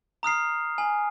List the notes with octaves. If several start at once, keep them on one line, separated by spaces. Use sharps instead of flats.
A#5 D#6 F6 C7
G#5